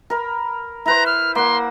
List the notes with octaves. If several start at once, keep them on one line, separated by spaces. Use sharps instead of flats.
A#4 B5
E4 B4 C5 A#5
F6
A#3 F#5 C6